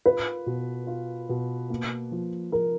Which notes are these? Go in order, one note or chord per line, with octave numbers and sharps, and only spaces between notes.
F4 B4
B2
F4
B2
A#3
F3
F3 A#4